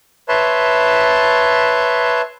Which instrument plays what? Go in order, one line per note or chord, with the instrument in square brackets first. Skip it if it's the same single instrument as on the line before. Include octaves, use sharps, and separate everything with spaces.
[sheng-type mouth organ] B4 C#5 E5 A5 C6